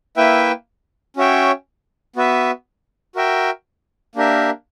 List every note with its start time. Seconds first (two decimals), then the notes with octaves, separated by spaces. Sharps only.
0.17 A#3 E4 B4 E5 G5
1.17 C#4 F#4 C#5 E5 G5
2.16 B3 F#4 B4 E5
3.15 F#4 A#4 E5 G5
4.15 A#3 D4 G4 A#4 E5